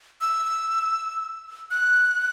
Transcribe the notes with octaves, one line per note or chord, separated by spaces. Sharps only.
E6
F#6